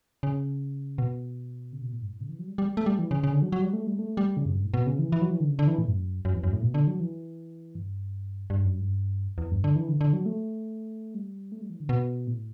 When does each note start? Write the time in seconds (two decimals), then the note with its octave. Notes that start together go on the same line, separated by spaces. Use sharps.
0.23 C#3
0.98 B2
1.73 C#3
1.82 B2
1.92 A2
2.01 G2
2.10 A2
2.21 C#3
2.29 E3
2.39 F#3
2.48 G3
2.58 G3
2.77 A3
2.86 G3
2.99 E3
3.11 C#3
3.24 C#3
3.33 D3
3.42 F#3
3.52 F#3
3.62 G3
3.73 A3
3.87 G3
3.99 A3
4.17 G3
4.37 C#3
4.46 F#2
4.55 G2
4.64 A2
4.74 B2
4.86 C#3
4.99 E3
5.12 E3
5.22 F#3
5.30 E3
5.40 D3
5.49 C#3
5.59 D3
5.68 E3
5.78 A2
5.88 F#2
6.25 F#2
6.34 E2
6.43 F#2
6.53 A2
6.62 B2
6.74 D3
6.87 F#3
7.00 E3
7.75 G2
8.50 G2
8.65 F#2
8.78 G2
9.38 E2
9.51 G2
9.64 D3
9.76 E3
9.88 D3
10.01 D3
10.13 F#3
10.26 A3
11.14 G3
11.52 A3
11.61 G3
11.70 E3
11.80 D3
11.89 B2
12.27 A2